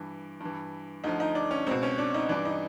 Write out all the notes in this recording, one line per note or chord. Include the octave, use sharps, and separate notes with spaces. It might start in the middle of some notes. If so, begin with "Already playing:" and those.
Already playing: G2 E3
G2 E3
D2 D3 F3 D#4
D#4
D4
C#4
C#2 B2 C4
C#4
D4
D#4
G2 E3 D4
D#4